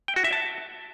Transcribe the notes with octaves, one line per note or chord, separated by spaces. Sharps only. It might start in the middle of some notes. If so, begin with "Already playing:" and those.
G5
F#4
E5
A5